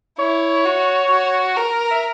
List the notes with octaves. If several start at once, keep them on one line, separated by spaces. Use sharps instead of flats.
E4 C#5
F#4
F#4
A#4
E5